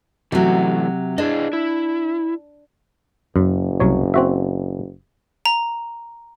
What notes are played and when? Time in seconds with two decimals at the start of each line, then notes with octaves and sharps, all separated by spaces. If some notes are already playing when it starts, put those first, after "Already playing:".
0.32 C3 E3 F#3 A3
1.18 D4 E4 G#4 D#5
1.53 E4
3.36 F#1 F#2
3.80 C2 F#3 C#5
4.14 C4 F#4 E5
5.46 A#5